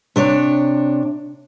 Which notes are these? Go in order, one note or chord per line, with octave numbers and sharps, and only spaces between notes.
C3 D4 C#5